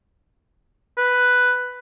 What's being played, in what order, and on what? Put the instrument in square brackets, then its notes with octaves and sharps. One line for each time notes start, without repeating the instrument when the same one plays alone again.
[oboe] B4